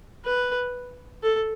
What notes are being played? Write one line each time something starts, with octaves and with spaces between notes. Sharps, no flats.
B4
A4